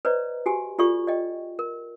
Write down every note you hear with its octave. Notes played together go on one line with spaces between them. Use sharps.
B4 C5 D5 D#5 A#5
F#4 G4 G#5
F4 G4 A4 D5 C#6
D5 D#5 G5
A#4